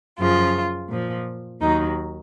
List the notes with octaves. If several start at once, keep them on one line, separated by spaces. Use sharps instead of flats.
F#2 C#3 F3 F4
A#2 F3
D#2 D#3 F#3 D#4